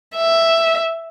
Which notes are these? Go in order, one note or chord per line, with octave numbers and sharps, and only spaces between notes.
E5